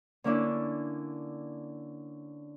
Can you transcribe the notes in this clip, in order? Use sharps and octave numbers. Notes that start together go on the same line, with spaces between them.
D3 A#3 C#4 D4 E4